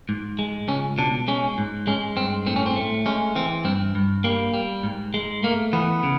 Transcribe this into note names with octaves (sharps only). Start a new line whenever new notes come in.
G#2
G#3
C#2 C#4
B2 D4
G#3 C#4
G#2
G#3 C#4
G2 C4
A2 C4
C#4
C4
A3
G#3 C#4
E3 C4
G2 C4
G2
G3 A#3
G3
G#2
G#3
A3 A#3
E3 B3
C#3